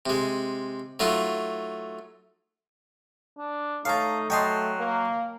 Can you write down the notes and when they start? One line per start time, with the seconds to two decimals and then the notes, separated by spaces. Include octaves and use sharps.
0.06 C3 G#3
1.00 F#3 A3 D#4 F4
3.38 D4
3.85 A3 D#4 C#5 F5 A5 A#5 G#6
4.30 F#3 C#5 D#5 G5 A5 C6 F6
4.79 A#3